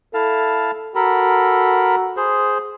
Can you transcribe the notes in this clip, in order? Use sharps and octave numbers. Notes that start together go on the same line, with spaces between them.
E4 A4 F5 A5
F#4 A4 A#4 B5
G#4 C5